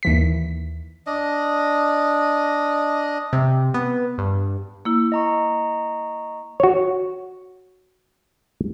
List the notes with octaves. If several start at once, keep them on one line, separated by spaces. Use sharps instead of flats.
D#2 E3 B6
D4 D#5
C3
B3
G2
A#3 E4
D#5 A#5 C#6
F#4 C#5